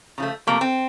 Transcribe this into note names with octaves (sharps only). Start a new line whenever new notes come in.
C#3 F3 A3
C3 F3 A3 A#3
C4